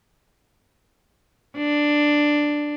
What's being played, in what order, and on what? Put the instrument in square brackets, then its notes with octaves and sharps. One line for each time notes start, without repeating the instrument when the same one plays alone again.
[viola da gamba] D4